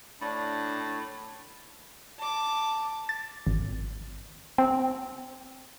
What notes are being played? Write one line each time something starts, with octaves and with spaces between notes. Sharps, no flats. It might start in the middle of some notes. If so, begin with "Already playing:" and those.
A2 D4
A5 D6
A6
G#1
C4